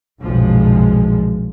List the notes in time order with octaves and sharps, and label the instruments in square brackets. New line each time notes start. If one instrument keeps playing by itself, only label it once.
[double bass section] F#1 B1 A#2 F3 G#3